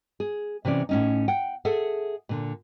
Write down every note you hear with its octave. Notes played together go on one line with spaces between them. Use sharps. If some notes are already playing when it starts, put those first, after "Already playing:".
G#4
C3 E3 C#4 D5
A2 C#4 D#4
F#5 G5
G#4 A4 E5 F#5
A#2 D3